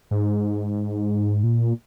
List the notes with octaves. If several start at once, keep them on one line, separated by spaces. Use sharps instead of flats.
G#2
A#2